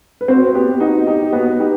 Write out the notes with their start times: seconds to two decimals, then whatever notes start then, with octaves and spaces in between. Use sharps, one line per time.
0.21 B4
0.28 C4 F#4 C5
0.54 B3 G4
0.80 D#4 F#4
1.07 D#4 G4
1.33 B3 F#4
1.60 D#4 G4